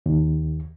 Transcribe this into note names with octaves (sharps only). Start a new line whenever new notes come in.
D#2